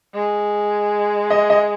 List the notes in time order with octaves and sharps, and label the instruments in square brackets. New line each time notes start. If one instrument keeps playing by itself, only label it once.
[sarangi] G#3
[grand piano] D#5
D#5